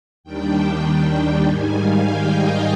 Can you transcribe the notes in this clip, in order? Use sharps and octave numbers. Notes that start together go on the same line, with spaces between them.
D#2 D#3 G3 D4 G5
G#2 D#3 G3 G#5
F5
G5
D#5